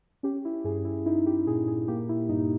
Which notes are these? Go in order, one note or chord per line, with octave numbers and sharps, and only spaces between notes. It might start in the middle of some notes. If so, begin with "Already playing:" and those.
C#4 G4
E4
G2 G#4
E4
D#4 E4
G4
A#2 G#4
G#4
A#3 G4
E4
G2 D#4